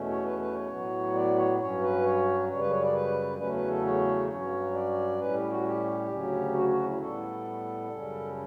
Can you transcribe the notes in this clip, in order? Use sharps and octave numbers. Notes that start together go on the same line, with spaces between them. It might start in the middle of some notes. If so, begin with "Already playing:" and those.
Already playing: E2 B2 A3 C#4
C#5
B4
B4
C#5
A2 F#3 B3
D5
C#5
G2 F#3 C#4 C#5
B4
C#5
F#2 C#3 G3 C#5
B4
C#5
D5
B4
E2 C#3 F#3 A3 C#4 B4
B4
A4
C#5
G2 F#3 C#4 C#5
D5
A2 G3 C#4 B4
G4
F#4
G4
D2 C#3 F#3 C#4
F#4
F#4
E4
A2 G3 B3 A4
F#2 C#3 G3 C#4